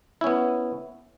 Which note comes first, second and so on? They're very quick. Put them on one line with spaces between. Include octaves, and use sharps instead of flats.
E4 C#4 B3